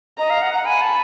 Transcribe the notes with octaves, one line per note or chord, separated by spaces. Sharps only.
D#5 A#5
F5
F#5
F#5
G#5 B5
A5